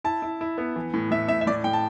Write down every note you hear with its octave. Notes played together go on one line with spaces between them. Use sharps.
E4 A5
E4
E4
B3
E3
A2
A2 E5
A2 E5
E5
A2 D5
A2 G5
A5